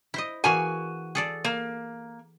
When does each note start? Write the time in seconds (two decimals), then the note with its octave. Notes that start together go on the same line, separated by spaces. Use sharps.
0.14 E4 C5 D#5
0.44 E3 A#3 F#4 G#4 G#5
1.15 G#4 A4 D5
1.44 A#3